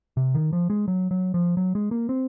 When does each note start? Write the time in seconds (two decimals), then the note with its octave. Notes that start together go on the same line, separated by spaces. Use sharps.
0.17 C3
0.35 D#3
0.53 F3
0.70 G#3
0.88 F#3
1.11 F#3
1.34 F3
1.57 F#3
1.75 G#3
1.91 A#3
2.09 C4